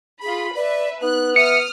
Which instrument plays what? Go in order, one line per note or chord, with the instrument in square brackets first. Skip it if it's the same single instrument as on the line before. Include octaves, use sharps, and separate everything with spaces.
[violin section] F4 B5 [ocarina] G#4
[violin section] B4 E5 [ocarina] D5
[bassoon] B3 [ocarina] D#4 [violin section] F#6
[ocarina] E5 [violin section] D#6 F6 [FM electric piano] C#7